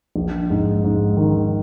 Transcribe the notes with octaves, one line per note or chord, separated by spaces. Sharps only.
A#1
G#2
G#2
D#3